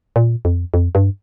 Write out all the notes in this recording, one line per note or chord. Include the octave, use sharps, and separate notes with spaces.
A#2
F2
F2
G2